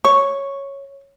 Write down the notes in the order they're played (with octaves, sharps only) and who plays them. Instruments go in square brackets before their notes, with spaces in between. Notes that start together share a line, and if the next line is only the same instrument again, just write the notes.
[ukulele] C#5 [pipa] C#6